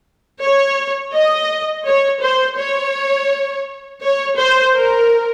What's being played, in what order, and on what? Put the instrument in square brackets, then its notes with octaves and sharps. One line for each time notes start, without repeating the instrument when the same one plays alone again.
[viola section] C#5
D#5
C#5
C5
C#5
C#5
C5
A#4